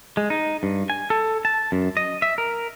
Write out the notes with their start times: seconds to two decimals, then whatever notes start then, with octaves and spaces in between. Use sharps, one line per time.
0.17 G#3
0.30 D#4
0.63 G2
0.90 G#5
1.10 A4
1.45 A5
1.72 F#2
1.97 D#5
2.22 E5
2.38 A#4